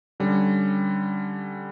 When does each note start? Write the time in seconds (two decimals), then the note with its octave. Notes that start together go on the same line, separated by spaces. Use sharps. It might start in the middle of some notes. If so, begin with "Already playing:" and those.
0.20 D3 G3 C#4